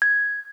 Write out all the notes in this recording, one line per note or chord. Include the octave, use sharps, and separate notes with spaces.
G#6